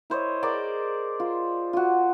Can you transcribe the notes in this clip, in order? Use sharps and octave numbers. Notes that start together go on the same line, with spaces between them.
E4 C5 C#5 D#5
G#4 A#4 D5 D#5
F4
F4 F#4